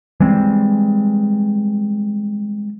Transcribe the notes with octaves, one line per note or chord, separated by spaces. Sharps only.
E3 G3 G#3 C4